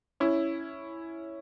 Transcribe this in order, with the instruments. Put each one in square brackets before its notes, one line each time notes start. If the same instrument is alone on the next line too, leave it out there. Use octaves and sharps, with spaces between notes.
[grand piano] C#4 E4